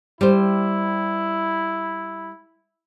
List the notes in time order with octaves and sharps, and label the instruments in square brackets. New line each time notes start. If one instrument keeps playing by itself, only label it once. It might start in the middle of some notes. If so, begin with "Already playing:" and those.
[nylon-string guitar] G3 C5 [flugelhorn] E4